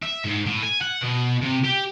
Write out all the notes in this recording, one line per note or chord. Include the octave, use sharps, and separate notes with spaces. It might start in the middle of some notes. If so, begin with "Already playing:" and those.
E5
G#2
A2
G#5
F#5
B2
C3
G4